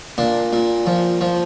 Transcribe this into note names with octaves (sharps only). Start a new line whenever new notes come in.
A#2 D4
A#2
F3
F3